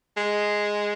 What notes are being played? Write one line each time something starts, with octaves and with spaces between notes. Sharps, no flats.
G#3